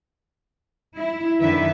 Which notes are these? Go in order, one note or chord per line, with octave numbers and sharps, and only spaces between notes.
E4
F#2 D3 D#3 E4 B4 E5